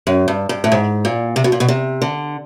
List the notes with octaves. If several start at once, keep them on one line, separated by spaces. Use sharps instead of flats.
F#2
G2
G2
A2
G#2
A#2
C3
B2
A#2
B2
C3
D3